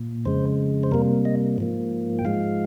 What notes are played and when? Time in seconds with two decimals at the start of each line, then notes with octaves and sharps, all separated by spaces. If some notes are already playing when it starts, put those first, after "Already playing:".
Already playing: A#2
0.25 F2 C#3 G#3 C5
0.83 C5
0.91 C3 G3 A#3 A#4
1.25 D#5
1.58 G#2 F3 A#3
2.19 G5
2.25 G#2 F3 G#3 F5